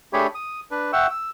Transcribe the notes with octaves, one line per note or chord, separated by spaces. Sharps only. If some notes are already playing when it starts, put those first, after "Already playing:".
A3 D4 G4 G#4 C#5 B5
D#6
D4 B4
E5 F#5 G5 C#6 E6
E6